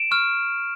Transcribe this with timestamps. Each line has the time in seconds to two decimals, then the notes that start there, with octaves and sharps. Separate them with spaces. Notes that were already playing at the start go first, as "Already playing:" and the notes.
Already playing: D7 E7
0.11 C#6 F6